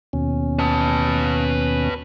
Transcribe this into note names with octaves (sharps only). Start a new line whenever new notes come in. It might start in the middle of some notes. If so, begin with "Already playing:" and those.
D#2 B2 C#4
B4 A5